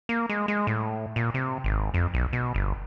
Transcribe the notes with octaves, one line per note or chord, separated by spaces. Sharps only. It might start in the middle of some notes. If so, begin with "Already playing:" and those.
A#3
G#3
G#3
A2
A#2
C3
G#1
F2
B1
B2
G1